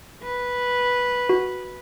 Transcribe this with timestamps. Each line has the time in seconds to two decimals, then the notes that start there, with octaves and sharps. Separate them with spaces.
0.23 B4
1.29 F#4